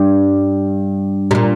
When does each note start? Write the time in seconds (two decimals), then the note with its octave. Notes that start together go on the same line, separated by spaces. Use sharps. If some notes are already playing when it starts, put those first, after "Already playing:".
Already playing: G2
1.31 C3
1.35 A#2